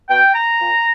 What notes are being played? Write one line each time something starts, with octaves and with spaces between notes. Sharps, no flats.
B2 G5
A#5
A#2